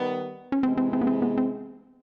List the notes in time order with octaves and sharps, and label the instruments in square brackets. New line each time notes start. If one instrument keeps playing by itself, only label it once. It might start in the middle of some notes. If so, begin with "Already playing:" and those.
Already playing: [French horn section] D#3 G3 B3
[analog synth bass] C#4
[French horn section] C3 E3 G#3 [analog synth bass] C4
[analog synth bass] C4
C4
B3
C4
B3
C4